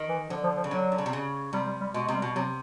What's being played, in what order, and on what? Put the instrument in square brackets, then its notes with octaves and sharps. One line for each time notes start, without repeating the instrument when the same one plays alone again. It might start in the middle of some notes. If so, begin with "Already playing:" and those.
Already playing: [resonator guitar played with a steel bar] D#3
[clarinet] E3
[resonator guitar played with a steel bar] D3 [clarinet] F3
[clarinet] F3
F3
[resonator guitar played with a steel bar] C#3
[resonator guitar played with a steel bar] D3 [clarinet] F#3
[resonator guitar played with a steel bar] D3
C#3
C3
C#3
[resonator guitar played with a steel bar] C3 [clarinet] G3
[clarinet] G3
G3
[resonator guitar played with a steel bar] B2 [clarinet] G#3
[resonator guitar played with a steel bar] C3 [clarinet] G#3
[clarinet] G3
[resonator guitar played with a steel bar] B2
[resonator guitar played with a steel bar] C3 [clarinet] F#3